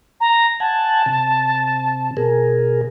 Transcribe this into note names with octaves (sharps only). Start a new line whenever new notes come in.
A#5
F#5 G#5 A5
C3
B2 G#4 A#4